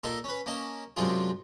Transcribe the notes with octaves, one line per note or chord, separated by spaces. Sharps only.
A#2 D#4 A4 A#4 D#5
C#4 B4
A#3 C#4 D#5 A5
F#2 C3 G#3 D4 F4 G#4